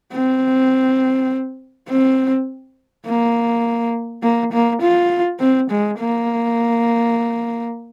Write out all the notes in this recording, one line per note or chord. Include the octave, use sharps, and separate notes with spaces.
C4
C4
A#3
A#3
A#3
F4
C4
G#3
A#3